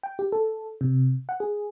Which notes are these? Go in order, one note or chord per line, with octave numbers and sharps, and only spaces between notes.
G5
G4
A4
C3
F#5
G#4